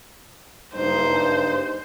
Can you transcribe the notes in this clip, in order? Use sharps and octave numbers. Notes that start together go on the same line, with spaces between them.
F#1 G2 D#4 C5